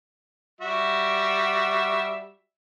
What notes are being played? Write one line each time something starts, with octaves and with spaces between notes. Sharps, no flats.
G3 F#4 E5